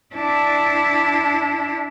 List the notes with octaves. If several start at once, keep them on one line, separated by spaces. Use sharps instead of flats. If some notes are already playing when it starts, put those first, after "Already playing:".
D4 E4